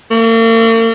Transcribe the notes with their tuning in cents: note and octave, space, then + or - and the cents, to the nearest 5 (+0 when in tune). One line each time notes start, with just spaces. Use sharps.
A#3 -45